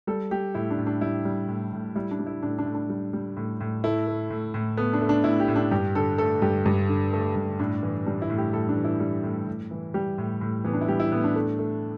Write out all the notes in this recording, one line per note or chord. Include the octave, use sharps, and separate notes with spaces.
G3 A4
G3 G4
A2 E4
D4
A2
D4
G3 E4
G3
A2
A2
G3 E4
D4
G3
E4
A2 D4
D4
A2
D4
G3
G3
A2
A2
A3 E4
A3
A2
A2
A3 B3
D4
A3
D4
A2 E4
G4
A2
D4
G2 G4
D3 A4
A3 A4
G2 G4
G2
D3
A3
G2
A2 D4
E3
G3 D4
E4
A2
G4
A2 A4
D4
E3
E4
G3
A2
A2
E3
G3 G4
A2
A2
E3 B3
D4
E4
G3 G4
E4
A2 B3
D4
A3
A3